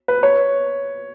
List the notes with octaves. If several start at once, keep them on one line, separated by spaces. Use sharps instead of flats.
B4
C#5